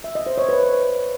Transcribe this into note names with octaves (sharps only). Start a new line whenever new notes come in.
E5
D#5
C5
C#5
B4